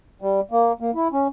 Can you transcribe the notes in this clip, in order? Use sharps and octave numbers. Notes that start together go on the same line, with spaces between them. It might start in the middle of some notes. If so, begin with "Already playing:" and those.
G3
A#3
A#3
E4
C#4